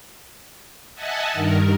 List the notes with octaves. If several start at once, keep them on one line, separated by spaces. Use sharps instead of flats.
D#5 E5 F#5 G#5 A5
G2 D#3 A#4